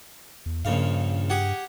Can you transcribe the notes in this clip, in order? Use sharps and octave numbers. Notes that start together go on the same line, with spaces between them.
E2
A#1 G2 C#3 F5
G4 G#4 F#5